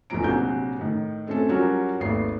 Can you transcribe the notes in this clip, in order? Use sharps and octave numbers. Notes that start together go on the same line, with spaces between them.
F1 E2 G#2 F3 A#5 D7
A#1 C3 F#3 G#5 G6
A2 D#3
A3 C4 C#4 A4
F#3 G3 C#4 F4 F#4 A#4
G#1 D#2 A3 B4 C7